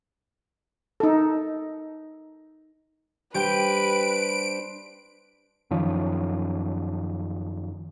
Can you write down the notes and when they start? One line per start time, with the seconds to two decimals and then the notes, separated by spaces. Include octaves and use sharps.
1.00 D#4 A4
3.34 G3 D4 G4 B4 C5 G5 D7
5.71 F#2 D#3 F3 C#4